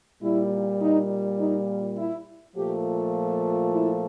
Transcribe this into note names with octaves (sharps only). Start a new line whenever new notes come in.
A#2 G3 E4
D#4
D#4
E4
A#2 F3 A3 G4
E4